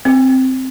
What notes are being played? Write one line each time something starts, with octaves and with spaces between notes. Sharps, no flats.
C4